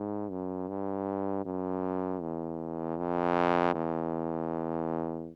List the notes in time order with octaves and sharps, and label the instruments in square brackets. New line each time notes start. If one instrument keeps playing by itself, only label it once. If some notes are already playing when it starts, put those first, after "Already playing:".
Already playing: [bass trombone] G#2
F#2
G2
F#2
E2
F2
E2